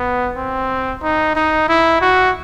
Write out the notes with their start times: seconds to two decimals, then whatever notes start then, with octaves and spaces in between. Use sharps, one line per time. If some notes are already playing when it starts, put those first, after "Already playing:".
Already playing: B3
0.37 C4
1.03 D#4
1.36 D#4
1.69 E4
2.01 F#4